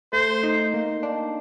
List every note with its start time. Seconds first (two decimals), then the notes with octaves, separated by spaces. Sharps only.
0.13 A3 C5
0.43 D#4
0.74 A#3
1.03 D4